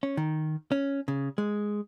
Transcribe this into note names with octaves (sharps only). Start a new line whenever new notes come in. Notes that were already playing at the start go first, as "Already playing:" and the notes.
C#4
D#3
C#4
C#3
G#3